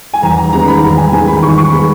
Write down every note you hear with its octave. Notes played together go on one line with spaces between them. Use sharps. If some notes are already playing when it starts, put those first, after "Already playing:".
G#5
E2 A#5
A#5
D#3 G#3 B3 A#5
B5
E2 A#5
G#5
D#3 G#3 B3 G#5
B5
E2 C#6
C#6
D#3 G#3 B3 B5